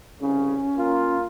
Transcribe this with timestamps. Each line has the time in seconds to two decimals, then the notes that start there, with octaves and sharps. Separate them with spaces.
0.21 C2 C#3 C#4
0.78 A#3 F4